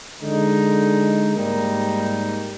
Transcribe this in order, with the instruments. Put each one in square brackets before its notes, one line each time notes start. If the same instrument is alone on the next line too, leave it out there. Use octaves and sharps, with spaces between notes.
[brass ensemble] D3 G#3 D#4
G#2 G3 A#3 D#4